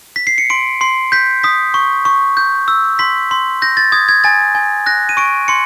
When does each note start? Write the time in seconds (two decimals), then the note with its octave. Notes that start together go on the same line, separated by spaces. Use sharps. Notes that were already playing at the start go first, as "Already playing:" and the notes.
0.16 B6
0.27 C7
0.38 C#7
0.50 C6 D7
0.81 C6 C7
1.12 G6 B6
1.43 D#6 B6
1.74 C#6
2.05 C#6
2.37 G6
2.68 E6
2.99 C6 B6
3.31 C6
3.62 G6 A#6
3.77 A6
3.92 D#6 G#6
4.09 G#6
4.24 G#5 A6
4.55 G#5
4.86 F#6 A#6
5.09 D#7
5.17 C#6 D7
5.48 C6 C#7